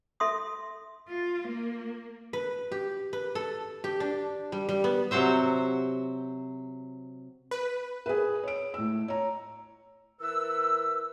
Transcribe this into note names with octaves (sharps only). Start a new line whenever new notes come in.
A4 E5 C6 D#6
F4
A#3
B4
G4
B4
A4
G4
D4
G3
G3
B3
C3 F#3 C5 E5
B4
G#4 B4
C#5 D7
A2 E6
C#5 A#5
E3 A#4 B4 E6